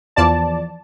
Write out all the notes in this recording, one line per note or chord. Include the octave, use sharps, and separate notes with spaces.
E2 F3 D5 A5